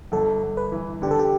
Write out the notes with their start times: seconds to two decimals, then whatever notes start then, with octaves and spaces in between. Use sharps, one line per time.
0.12 G1 A4
0.42 G1
0.57 B4
0.72 E3
1.02 D3 G4
1.11 A4
1.19 G4